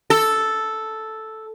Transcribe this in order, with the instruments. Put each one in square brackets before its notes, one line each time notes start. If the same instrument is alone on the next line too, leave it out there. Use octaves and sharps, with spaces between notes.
[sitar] A4